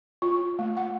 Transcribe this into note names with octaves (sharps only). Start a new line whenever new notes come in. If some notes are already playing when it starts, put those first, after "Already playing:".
F4
A3
F#5